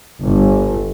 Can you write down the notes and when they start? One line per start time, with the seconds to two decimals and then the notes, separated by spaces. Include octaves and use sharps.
0.24 G1